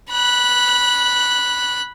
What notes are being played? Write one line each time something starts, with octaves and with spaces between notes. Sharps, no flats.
B5 F#6